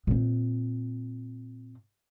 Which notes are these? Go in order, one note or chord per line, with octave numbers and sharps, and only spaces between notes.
A#2 C4